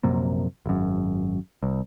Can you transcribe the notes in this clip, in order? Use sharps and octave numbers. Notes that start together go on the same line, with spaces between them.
A#1 F#2 C3 A#3
G#1 F#2
C2